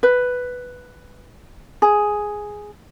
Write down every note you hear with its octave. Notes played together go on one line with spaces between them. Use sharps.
B4
G#4